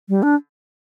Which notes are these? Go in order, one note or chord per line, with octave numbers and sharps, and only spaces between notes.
G3
D4